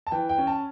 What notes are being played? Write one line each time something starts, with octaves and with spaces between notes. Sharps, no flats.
A5
E3 G5
G5
C#4
A5